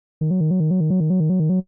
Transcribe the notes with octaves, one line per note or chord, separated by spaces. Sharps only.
D#3
F#3
D#3
F#3
D#3
F#3
D#3
F#3
D#3
F#3
D#3
F#3
D#3
F#3